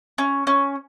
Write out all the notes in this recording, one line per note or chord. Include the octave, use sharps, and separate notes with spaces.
C#4
C#4